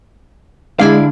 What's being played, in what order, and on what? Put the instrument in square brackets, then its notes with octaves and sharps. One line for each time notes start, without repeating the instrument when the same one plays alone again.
[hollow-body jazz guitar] D3 D4 F5 [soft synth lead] G#3 [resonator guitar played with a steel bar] E4 G#4 D5